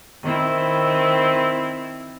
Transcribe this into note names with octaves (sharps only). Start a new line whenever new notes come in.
D#3 C4 E4